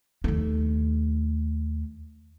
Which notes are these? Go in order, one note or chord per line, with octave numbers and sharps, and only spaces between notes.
D#2 A3